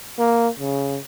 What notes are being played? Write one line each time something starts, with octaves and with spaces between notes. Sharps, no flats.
A#3
C#3